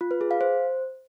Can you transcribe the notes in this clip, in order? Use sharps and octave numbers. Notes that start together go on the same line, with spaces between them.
F4
B4
G#4
F5
C5